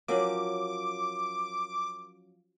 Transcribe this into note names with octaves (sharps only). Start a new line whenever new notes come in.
F3 F#3 C#4 A#4 C#5 D6